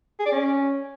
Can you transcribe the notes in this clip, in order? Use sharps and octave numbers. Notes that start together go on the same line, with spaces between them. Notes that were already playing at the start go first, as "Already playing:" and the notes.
G#4
D5
C#4